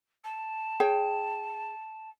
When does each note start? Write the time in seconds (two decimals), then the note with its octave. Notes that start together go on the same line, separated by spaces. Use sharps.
0.24 A5
0.80 G#4 C#5 G5